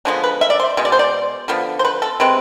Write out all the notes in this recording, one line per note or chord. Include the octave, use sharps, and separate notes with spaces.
D3 F3 G#3 B3 D4
B4
E5
D5
C5
B2 G#3
D5
C5
D5
D3 F3 B3
C5
B4
A4
C3 G#3 C4 B4